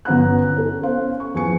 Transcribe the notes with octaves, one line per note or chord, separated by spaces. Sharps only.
G1 B3 C#4 F#5 A#5 F#6
C#4 A4
B3 C#4 C5 F5
C#6
E2 F3 G#5 C#7